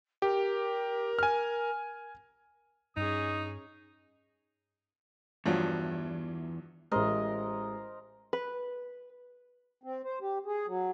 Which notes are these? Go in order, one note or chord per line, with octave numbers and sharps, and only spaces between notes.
G4 A#4
G#5 F6
G2 C#4 D#4 G#4 D#6
E2 G2 F3 F#3
A1 G#3 A#4 C5 D#5
B4
C4
C5
G4
G#4
F#3